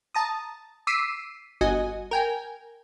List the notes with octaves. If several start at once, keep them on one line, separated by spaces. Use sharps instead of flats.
A5 A#5 D#6
D6 E6 B6 C7 D#7
G1 F#4 D#5 G#5
A#4 G5 G#5